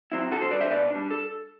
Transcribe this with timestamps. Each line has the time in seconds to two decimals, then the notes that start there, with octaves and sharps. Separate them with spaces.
0.12 F#3 C4 E4
0.31 D3 F#4 A4
0.41 A4 C5
0.51 G3 D4 B4 D5
0.61 C5 E5
0.70 B2 B4 D5
0.90 G3 D4
1.11 A4